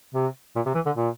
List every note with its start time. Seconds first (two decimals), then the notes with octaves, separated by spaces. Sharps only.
0.14 C3
0.56 A#2
0.66 C3
0.75 E3
0.86 D3
0.96 A#2